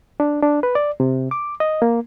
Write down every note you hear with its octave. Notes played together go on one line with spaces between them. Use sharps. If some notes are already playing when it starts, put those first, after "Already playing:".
D4
D4
B4
D5
C3
D6
D#5
A#3